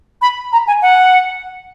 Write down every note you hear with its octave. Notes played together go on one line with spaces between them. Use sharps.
B5
A#5
G#5
F#5